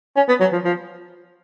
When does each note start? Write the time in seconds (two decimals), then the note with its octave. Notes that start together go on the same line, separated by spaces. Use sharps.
0.16 C#4
0.28 B3
0.40 F#3
0.52 F3
0.64 F3